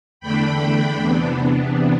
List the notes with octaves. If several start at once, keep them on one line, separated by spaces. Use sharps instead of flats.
E2 D3 A3 D4 G5 B5
G5 B5
E2 C3 E3 B3 D4